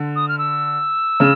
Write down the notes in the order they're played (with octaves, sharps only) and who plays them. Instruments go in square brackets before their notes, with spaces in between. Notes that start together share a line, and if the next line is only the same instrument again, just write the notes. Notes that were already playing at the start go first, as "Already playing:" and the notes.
Already playing: [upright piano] D3
[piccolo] D#6
F6
E6
[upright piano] C#3